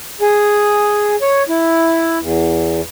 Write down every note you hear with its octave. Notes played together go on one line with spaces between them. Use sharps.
G#4
C#5
E4
E2